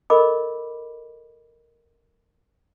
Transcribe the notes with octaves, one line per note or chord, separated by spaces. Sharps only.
A4 A#4 D#5 B5 D6